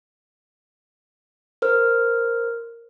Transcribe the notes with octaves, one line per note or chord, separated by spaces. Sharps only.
A#4 C5 F6